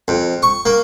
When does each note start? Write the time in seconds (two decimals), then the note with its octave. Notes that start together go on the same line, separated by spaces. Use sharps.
0.08 F2
0.43 C#6
0.66 A#3